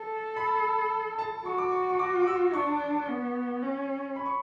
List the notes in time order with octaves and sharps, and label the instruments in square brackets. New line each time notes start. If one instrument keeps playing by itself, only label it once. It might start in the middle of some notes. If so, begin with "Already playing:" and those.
Already playing: [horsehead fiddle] A4 [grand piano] A5
[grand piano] B5
A5
[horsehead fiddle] F#4 [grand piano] C#6
[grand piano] D6
C#6
C#6
D6
D6
E6
[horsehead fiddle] D4 [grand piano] C#6
[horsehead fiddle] B3
C#4
[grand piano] B5
C#6